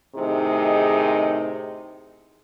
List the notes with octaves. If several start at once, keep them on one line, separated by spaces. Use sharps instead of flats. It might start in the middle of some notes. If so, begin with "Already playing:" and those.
A2 C3 D#3 D#4 G#4 D#5